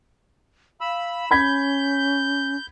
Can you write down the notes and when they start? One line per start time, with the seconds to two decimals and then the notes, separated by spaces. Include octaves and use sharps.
0.81 F5 B5 E6
1.31 C#4 B5 G6 G#6 B6